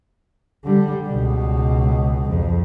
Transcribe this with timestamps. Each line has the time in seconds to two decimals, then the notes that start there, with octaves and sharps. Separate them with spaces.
0.65 D3 G3
1.08 C#2 B2
2.29 F2